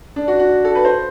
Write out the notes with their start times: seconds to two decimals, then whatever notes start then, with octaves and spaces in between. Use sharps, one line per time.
0.16 D4
0.28 F#4
0.39 F#4
0.65 A4
0.75 B4
0.85 C5